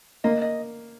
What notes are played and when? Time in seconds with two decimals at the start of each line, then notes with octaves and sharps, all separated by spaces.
0.24 A#3 D#5
0.42 D#5